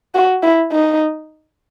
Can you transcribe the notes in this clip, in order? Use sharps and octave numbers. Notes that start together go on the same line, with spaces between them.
F#4
E4
D#4